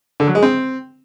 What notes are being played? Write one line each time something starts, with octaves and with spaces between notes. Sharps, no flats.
D3
F#3
G#3
C4